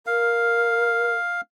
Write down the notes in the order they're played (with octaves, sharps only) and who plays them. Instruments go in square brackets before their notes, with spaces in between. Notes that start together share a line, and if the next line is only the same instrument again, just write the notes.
[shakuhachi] A#4 [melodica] F5